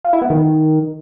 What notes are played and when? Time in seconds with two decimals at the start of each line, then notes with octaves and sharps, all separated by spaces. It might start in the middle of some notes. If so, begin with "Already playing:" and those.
0.05 F4
0.13 E4
0.22 B3
0.30 D#3